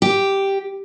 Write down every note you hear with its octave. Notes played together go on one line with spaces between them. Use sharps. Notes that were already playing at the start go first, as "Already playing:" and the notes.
G4